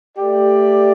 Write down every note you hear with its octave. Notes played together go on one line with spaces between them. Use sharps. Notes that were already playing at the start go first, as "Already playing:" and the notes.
A3 G4 D5